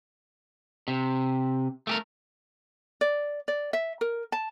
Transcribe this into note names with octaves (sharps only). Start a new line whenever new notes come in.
C3
A3 G4 A#4
D5
D5
E5
A#4
A5